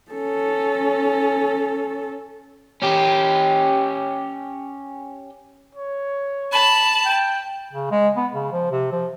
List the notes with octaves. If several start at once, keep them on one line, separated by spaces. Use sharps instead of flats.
C#4 A4
C#4 G4
C#5
A5 B5
G5
C#3
G#3
B3
C#3
F3
C3
F3